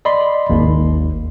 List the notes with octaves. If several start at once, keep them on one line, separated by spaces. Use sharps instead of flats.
D5 D#5 B5 C6
G#1 D#2